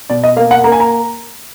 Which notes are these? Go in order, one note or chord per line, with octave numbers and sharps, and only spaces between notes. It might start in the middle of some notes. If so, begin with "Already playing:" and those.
B2 D5
D#5
A#3 F5
F#5
A#3 A#5
G#5
A#5